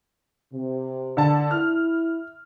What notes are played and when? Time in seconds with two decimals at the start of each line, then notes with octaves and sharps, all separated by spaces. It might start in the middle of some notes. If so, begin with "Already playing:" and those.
0.53 C3
1.17 D3 A5
1.51 E4 F6